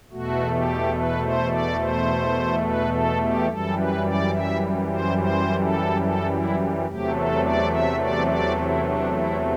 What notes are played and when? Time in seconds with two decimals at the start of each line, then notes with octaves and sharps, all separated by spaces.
0.11 E2 B2 A3 F#4
0.53 G4
0.96 B4
1.23 C5
1.51 D5
1.79 C5
2.64 B4
2.92 A4
3.21 G4
3.48 F#2 E3 G3 A4
3.77 B4
4.05 D5
4.33 E5
4.90 C5
5.18 C5
5.60 A4
6.01 A4
6.30 E4
6.86 E2 C3 F#3 A3 G4
7.15 A4
7.43 D5
7.71 E5
7.99 D5
8.27 D5
8.55 E4
8.83 D4
9.12 E4